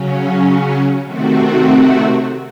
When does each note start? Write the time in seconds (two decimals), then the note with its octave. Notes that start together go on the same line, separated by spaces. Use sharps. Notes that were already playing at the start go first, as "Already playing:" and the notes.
Already playing: C#3 F#3 C#4
1.04 C3 D#3 A3 C4 F#4